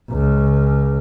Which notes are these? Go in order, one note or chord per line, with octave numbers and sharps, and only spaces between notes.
C#2